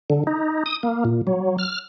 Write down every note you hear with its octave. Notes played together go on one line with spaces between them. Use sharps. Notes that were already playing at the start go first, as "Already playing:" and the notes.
D3
D#4
D#6
A#3
A#2
F#3
F6